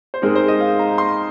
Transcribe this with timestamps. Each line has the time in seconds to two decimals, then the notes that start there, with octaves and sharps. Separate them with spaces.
0.14 C5
0.22 G#2 G#3 C4 D#4 A#4
0.35 C5
0.48 D#5
0.60 F5
0.79 A#5
0.98 C6